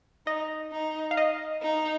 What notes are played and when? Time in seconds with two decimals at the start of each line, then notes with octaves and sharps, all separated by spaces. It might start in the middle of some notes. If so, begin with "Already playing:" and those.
0.27 D#4 D#5
0.72 D#4
1.11 F5
1.17 D#5
1.62 D#4